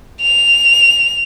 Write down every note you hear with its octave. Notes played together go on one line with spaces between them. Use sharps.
F7